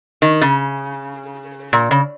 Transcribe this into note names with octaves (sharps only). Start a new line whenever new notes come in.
D#3
C#3
A#2
C#3